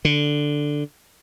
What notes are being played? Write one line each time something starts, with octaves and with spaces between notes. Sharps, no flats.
D3